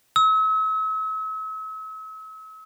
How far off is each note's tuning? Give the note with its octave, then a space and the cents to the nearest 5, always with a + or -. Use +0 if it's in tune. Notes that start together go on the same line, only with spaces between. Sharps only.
E6 -40